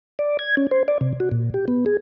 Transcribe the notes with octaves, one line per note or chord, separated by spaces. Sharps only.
D5
G#6
C#4
C5
D5
C3
F#4
A#2
G4
B3
G#4